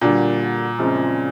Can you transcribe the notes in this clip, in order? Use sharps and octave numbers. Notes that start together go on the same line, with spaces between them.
A#2 D3 G3 A#3 D4 F#4
F#2 C#3 F3 G#3 C4